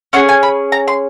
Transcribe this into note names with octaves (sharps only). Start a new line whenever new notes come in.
C#4 F4 G#4 F#5
G#5
B5
A#5
C6